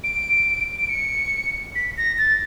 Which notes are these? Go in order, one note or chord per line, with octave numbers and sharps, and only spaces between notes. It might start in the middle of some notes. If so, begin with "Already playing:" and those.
D7
D7
C#7
B6
A#6
A6